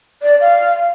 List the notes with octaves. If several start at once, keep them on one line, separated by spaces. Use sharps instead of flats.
D5
F5